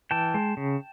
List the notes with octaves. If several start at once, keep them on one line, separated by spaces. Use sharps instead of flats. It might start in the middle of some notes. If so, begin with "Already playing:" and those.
E3 G5 A5
G#3
C#3